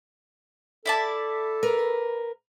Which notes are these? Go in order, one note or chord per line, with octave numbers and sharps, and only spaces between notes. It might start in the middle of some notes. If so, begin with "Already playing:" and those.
E4 A4 D5 A5
A#4 B4